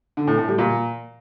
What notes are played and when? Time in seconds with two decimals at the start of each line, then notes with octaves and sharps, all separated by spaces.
0.17 D3
0.27 A2
0.38 A2
0.48 G3
0.58 A#2